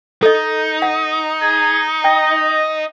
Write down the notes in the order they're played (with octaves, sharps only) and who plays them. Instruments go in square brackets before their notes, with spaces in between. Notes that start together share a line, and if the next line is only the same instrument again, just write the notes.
[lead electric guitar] D#4 [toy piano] A4 D#5
[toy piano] F#5
[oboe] G#4
[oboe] D#5 [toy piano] G5